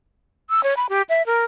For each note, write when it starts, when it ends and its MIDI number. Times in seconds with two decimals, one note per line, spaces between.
0.50 0.63 88
0.63 0.74 73
0.77 0.87 83
0.89 1.02 67
1.09 1.22 76
1.26 1.45 70